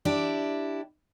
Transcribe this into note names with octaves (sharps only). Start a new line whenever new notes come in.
D4 E4 G4